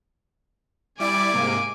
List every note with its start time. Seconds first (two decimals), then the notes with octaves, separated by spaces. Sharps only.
1.00 G3 E4 D5 G#5 D6
1.33 G#2 C3 A#3